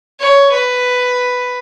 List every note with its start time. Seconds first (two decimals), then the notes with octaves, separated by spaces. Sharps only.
0.19 C#5
0.52 B4